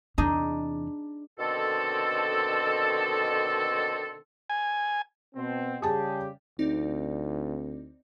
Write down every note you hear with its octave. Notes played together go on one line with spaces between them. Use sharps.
E2 C3 D4 D#4 G#4 D#5
B2 D3 D#3 C4 A4
G#5
B2 C4
C#3 G3 G4 G#4 A5
D2 C4 D#4 D5